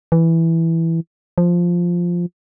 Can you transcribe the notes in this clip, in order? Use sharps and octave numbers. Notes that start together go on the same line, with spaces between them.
E3
F3